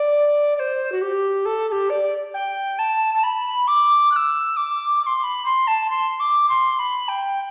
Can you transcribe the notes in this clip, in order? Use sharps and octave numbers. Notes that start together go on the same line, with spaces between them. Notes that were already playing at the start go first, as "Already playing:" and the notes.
Already playing: D5
D5
C5
F#4
G4
A4
A4
G4
D5
G5
A5
A5
B5
D6
F#6
E6
D6
D6
C6
B5
C6
A5
C6
D6
C6
B5
G5